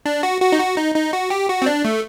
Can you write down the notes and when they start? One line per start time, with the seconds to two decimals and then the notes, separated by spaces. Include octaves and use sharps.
0.06 D4
0.23 F#4
0.41 F#4
0.52 D#4
0.59 F#4
0.77 D#4
0.95 D#4
1.13 F#4
1.30 G4
1.49 F#4
1.62 C4
1.66 D4
1.85 A3